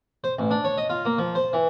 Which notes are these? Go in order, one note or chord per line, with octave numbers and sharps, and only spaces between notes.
C5
A1
D4
C#5
D#5
F4
A#3
F3
C5
E3